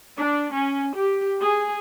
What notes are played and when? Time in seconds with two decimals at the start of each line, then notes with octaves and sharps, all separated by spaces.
0.17 D4
0.54 C#4
0.96 G4
1.39 G#4